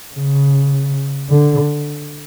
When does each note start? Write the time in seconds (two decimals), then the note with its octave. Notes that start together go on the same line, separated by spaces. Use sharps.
0.16 C#3
1.30 D3